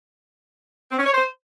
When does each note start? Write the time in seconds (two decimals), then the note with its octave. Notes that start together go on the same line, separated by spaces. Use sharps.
0.92 C4
0.99 C#4
1.06 C#5
1.13 C5